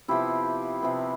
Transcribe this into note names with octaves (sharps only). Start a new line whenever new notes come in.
C3 F3 B3 E4 G4
C3 F3 B3